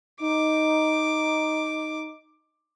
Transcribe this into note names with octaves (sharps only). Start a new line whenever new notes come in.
D#4 D6